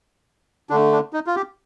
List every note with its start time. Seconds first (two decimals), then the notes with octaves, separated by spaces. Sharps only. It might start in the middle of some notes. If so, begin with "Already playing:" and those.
0.70 D3 A3 D4
0.92 D4
1.13 D#4
1.27 F4
1.36 G4